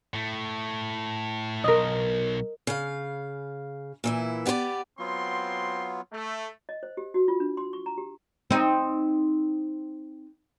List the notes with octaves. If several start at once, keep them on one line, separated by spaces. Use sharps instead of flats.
A2 A3
B1 A#4 D#5
C#3 F5
A#2 E3 E4
B3 G4 B4 C5 D5
F#3 B3 C4 F4 C6
A3
D#5
C5
G4
F#4
F4
D4
C6
C#6
A#5
G4
C4 D#4